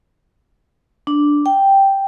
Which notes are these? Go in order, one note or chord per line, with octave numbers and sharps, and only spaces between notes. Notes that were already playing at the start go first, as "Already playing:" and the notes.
D4
G5